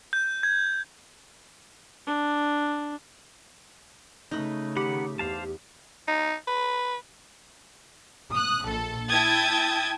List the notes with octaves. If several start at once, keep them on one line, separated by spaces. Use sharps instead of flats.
G6
G#6
D4
C#3 A3 D#4 B4
D#3 G4 F#5 B5
E2 C5 F5 A5
D#4
B4
D#6 F#6
A#1 A4
E4 G5 A5 D#6 G#6 A6